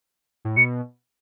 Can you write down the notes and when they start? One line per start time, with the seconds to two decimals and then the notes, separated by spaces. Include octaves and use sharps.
0.45 A2
0.57 B2 C#7